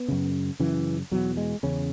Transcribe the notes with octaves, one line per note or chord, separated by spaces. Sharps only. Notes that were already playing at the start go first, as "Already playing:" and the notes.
Already playing: B3
F#2 C#3
F#2 C#3 E3
E2 B2 F#3
G#3
E2 C#3 C#4